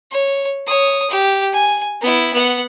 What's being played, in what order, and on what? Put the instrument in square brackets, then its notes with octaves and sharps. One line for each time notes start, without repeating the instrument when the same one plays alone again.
[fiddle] C#5
C#5 D#6
G4
G#5
B3 E4
B3 F#5